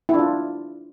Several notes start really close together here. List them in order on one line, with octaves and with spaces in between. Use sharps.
E4 D4 F4